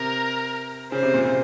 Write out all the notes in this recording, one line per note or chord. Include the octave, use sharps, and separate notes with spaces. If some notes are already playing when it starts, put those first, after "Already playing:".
Already playing: C3 A#4
C#3 C5
C3
A#2
C3